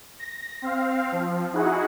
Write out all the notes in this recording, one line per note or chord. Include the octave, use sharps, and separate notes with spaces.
A#6
C4 F5
F3
D#4 E4 F#4 G#4 F#5